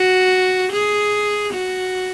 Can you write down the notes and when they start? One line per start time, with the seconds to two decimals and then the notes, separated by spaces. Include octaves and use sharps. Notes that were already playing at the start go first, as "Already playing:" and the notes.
Already playing: F#4
0.73 G#4
1.54 F#4